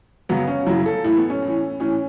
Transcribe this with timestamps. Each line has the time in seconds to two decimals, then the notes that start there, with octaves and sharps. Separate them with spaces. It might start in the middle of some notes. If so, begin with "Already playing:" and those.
0.29 F#2 C#3 F#3 B3
0.48 C#4
0.67 F#2 C#3 F#3 E4
0.86 A4
1.04 A2 E3 E4
1.17 B3
1.30 C#4
1.42 A2 E3
1.80 A2 E3 C#4